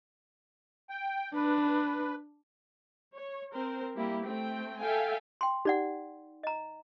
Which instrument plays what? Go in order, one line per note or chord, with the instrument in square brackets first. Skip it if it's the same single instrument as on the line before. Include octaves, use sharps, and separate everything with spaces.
[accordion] G5
[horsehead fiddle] D4 [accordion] B4
[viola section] C#5
C4 A#4 C5
G3 A#3 E4 G4
A3 C4 G5
A4 E5 F5 G5 G#5
[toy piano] G5 C6
[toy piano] D#4 D5 F#5 [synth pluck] G4
[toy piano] D#5 A#5